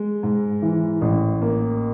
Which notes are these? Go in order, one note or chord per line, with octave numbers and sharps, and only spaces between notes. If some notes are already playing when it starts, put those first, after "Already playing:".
Already playing: G#3
G#2
E3
A1
A#3